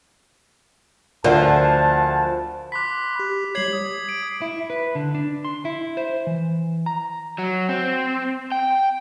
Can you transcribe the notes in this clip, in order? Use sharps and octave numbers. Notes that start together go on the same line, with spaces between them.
D2 F3 A#4 D5 E5 F#5 A5
B5 C6 D6 F#6 B6
G4
G3 G4 C#5 G#6 C7 F#7
D#6
D7
E4
B4
D3
D4
C6
E4
C5
E3
A#5
F#3
C4
G5